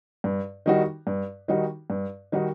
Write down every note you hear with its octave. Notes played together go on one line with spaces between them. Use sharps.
G2
D#3 G3 D#4 F#4
G2
D#3 G3 D#4 F#4
G2
D#3 G3 D#4 F#4